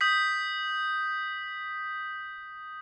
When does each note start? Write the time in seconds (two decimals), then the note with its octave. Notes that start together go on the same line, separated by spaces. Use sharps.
0.01 D#6 G6 B6